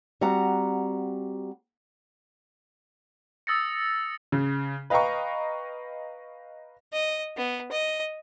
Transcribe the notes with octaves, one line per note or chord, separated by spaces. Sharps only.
G3 C4 F#4 F#5 A#5
D#6 E6 A6 A#6 C#7
C#3
B4 D#5 F5 G5 A#5 C#6
D#5
B3
D#5